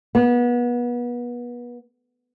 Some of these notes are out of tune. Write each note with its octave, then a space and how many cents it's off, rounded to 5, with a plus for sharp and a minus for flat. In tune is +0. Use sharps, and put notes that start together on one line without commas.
B3 -30